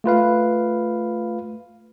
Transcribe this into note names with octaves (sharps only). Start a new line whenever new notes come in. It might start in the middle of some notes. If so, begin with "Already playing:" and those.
A3 F4 B4 F5